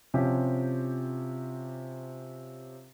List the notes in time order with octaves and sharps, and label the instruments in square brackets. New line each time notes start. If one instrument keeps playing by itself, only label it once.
[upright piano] C3 F3 C#4 G4